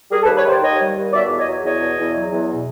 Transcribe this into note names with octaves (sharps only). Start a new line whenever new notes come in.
G3 G#4 A#4
A4 B4
D#2
B4 C#5
D#3 C5 D5
D#2 C#5 D#5
G3
D#2
B2 D5 E5
E2
C#5 D#5
F#3
E2 C#5 D#5
B2
E2
F#3
E2
B2